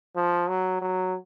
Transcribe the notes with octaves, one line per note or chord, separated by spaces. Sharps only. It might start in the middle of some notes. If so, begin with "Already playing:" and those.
F3
F#3
F#3